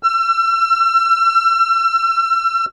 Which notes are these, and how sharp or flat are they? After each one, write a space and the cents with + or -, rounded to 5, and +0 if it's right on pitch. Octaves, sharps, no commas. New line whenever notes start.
E6 +40